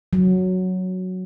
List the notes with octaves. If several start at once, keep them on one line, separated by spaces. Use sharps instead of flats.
F#3